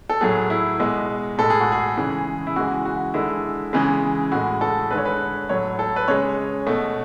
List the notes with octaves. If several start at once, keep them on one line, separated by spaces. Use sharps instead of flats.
A4
A2 F#3 A3 G#4
E4
B2 G#3
A2 G#3 A4
G#4
F#4
G#4
C#3 E3 G#3
E4
C#3 E3 G#3 F#4
F#4
D3 G#3 E4
C#3 E3 G#3
A2 G#3 F#4
A4
D3 G#3 B4 C#5
B4
A2 F#3 A3 C#5
A4
B4
C#3 G#3 C#5
B2 A3